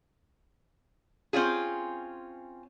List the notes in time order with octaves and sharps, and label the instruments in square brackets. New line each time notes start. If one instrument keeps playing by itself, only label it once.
[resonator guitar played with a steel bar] C4 C#4 F4 G#4